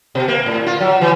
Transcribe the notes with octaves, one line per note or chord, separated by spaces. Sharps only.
B2
A#3
A2
F4
F#3
E3